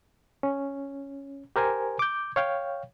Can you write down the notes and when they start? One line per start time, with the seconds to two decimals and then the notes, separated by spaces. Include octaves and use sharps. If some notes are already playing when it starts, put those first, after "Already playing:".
0.43 C#4
1.56 G4 A#4 C5 G#5
1.99 D6 G6
2.36 C#5 F5 G5